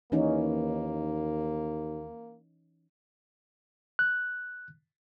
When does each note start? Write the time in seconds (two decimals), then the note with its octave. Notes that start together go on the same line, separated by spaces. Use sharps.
0.12 D#2 E3 A#3 C#4 D#4
3.99 F#6